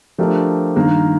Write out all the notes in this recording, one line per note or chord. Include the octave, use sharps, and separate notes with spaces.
F3 A3 D4 G4 A#4
G2 D#3 A#3